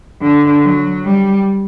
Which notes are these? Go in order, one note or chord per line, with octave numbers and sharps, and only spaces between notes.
D3
F#3
G3